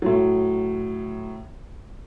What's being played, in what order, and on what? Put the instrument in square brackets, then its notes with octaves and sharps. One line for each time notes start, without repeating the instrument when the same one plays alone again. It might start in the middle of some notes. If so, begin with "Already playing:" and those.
[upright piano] A2 F#3